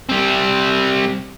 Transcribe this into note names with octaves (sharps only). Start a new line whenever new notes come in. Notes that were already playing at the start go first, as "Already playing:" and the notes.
G3 C4